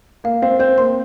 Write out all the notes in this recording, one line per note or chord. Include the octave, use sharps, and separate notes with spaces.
A#3 F5
C4 F5
C4 G6
A#3 C6